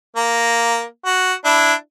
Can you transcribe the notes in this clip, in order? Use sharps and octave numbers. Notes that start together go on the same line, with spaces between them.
A#3
F#4
D4 E4